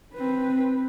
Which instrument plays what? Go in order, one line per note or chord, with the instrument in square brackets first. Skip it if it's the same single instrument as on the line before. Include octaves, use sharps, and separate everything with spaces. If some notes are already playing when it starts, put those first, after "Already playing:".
[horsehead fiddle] C4 B4